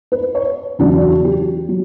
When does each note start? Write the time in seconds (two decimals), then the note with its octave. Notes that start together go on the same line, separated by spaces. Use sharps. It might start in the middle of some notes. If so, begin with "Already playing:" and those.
0.12 B4
0.35 C#5
0.79 E2 C#3 F#3 D4
1.01 F#4
1.25 G4
1.69 F#3